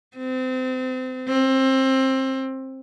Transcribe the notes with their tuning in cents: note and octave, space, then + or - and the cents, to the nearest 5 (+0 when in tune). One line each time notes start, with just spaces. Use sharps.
C4 -30
C4 +20